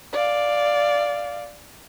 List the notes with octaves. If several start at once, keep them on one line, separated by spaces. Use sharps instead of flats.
D5 F5